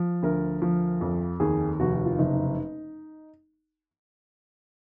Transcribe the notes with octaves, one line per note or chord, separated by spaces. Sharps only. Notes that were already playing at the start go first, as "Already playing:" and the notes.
Already playing: F3
D2 A#4
F3
F2
D#2 G#4
F1 F#4
F#4
F4
F#1 D#4